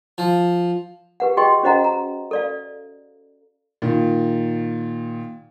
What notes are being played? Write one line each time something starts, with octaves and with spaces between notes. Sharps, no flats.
F3
G4 B4 F#5
F#4 G#4 D#5 G5 C6 C#6
C#4 F#4 C5 D#5 F#5 A#5
A#5
A4 D5 F5
A#2 D#3